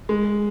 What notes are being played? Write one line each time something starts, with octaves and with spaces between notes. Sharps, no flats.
G#3